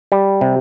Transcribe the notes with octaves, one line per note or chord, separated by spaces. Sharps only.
G3
C3